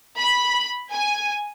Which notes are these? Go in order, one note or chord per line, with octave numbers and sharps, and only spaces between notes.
B5
G#5